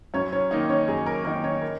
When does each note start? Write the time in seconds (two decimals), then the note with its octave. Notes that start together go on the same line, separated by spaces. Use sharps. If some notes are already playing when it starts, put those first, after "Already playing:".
0.14 F#2 C#4 C#5
0.33 C#4 C#5
0.51 D#3 A#3 D#4 D#5
0.70 C#4 C#5
0.88 F#2 G#4
1.06 A#4
1.25 D#3 A#3 D#4 A#4
1.44 C#4 C#5
1.62 A#4